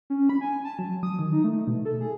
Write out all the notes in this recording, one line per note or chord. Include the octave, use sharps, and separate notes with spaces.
C#4
B5
G#5
A5
F#3
D#6
D#3
D#4
A3
B2
A4
G#4